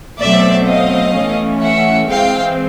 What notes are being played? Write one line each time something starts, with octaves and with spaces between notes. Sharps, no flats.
B2 F#3 A3 C4 D5 E5
D#5 F5
E3 A3 C#4
E5 F#5
E3 G#3 C4 F5 G5